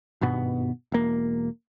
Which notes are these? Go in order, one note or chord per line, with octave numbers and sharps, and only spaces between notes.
G#1 G2 B2 B3
E1 A#3